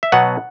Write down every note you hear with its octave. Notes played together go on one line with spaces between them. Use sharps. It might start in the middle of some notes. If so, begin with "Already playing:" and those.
E5
B2 F#3 B3 F#5